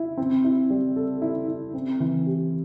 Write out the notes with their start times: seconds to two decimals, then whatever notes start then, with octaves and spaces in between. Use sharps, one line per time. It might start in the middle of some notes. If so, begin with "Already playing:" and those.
Already playing: E4
0.17 C4
0.44 E4
0.70 G3
0.96 A4
1.22 E4
1.48 E4
1.74 C4
2.00 E3
2.26 G4